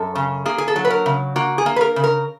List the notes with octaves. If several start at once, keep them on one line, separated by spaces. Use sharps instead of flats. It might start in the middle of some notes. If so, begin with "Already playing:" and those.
Already playing: F#2 A4
C#3
A#3 G#4
G#4
A4
F#3
B4
A#4
C#3
A#3 F#4
G#4
A#3
B4
A#4
C#3
A#4